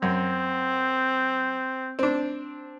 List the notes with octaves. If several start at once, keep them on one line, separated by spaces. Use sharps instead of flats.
F#2 C4
C4 D4